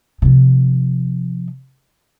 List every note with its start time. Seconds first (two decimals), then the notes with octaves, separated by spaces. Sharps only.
0.22 C3 F3